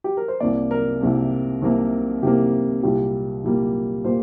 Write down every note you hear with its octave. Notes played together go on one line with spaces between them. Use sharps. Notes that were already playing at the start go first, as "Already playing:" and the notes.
G4
A#4
C5
C2 C3 A#3 D5
A#4
C2 C3 A#3
C2 C3 A#3
C2 C3 A#3 G4
C2 A#2 G3 A#3 G4
C2 A#2 G3 A#3
A#2 G3 A#3 C5